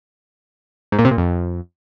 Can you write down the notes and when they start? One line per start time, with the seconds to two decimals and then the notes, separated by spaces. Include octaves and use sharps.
0.92 G#2
0.99 A#2
1.05 C3
1.11 A#2
1.17 F2